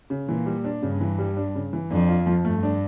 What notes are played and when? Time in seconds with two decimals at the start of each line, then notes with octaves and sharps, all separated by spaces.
0.10 C#3
0.28 A#2 E3
0.46 G3
0.64 D4
0.82 G2 C#3
1.01 E3
1.19 G3
1.37 D4
1.55 C#3
1.73 E3
1.91 F2 D4
2.08 F4
2.27 F3
2.45 G2 A3
2.63 D4